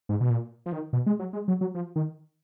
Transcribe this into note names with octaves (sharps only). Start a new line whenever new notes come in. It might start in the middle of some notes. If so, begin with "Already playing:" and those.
G#2
B2
A#2
F3
D#3
B2
G#3
F#3
G#3
F#3
F#3
F3
D#3